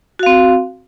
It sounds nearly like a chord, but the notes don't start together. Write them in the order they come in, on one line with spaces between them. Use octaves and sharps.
F#4 F5 C4